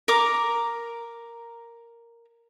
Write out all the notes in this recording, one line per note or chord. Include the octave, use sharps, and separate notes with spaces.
A#4 A#5 D6